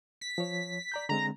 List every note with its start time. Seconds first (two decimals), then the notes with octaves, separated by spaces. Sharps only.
0.21 B6
0.38 F3 C#5
0.92 D5 A#5 G6
1.09 D3 G#3 C4 A#5